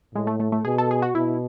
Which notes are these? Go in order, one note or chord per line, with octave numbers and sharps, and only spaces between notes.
A2 G#3
A3
A3
A3
B2 G#4
A4
G#4
F#4
B2 E4